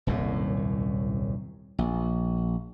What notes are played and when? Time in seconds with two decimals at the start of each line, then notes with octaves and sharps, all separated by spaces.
0.07 D#1 C2 F#2 A2
1.79 A#1